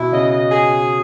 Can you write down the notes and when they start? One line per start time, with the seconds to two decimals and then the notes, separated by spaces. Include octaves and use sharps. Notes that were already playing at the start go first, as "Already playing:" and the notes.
Already playing: B2 E4
0.12 C#3 D#5
0.51 G#4